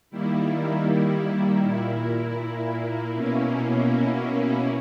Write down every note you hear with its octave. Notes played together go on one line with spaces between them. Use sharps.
D#3 G3 A#3 E4
A#2 A#3 E4
B2 A#3 C#4 E4